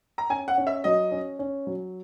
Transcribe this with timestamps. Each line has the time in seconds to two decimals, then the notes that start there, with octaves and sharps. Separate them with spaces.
0.18 A#5
0.30 C#4 G#5
0.48 F#5
0.58 C#4
0.67 E5
0.84 F#3 D#5
1.11 C#4
1.39 C#4
1.67 F#3